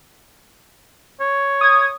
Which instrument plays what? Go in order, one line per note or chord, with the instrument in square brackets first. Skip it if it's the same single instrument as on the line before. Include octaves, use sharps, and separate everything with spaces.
[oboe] C#5
[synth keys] D#6 G#6